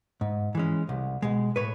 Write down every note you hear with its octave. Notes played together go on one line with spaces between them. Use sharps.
G#2
E3 G#3 C#4
C2
B2 G#3
A2 B4 C#5